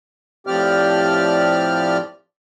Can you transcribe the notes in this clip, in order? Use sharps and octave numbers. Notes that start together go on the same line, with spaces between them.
A2 F3 C4 G4 D5 F6